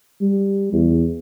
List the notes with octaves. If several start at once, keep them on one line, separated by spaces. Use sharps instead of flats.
G3
E2